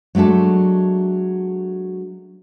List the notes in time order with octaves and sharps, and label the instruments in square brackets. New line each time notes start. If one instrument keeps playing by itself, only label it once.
[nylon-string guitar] F#3 G#3 A3 D4 A4